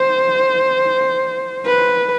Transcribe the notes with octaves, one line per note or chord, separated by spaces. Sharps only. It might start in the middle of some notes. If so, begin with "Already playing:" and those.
Already playing: C5
B4